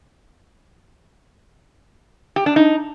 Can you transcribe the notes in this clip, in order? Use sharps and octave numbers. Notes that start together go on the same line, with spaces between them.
G4
D4
D#4